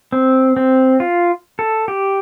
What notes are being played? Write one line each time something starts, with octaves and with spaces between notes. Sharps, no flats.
C4
C4
F4
A4
G4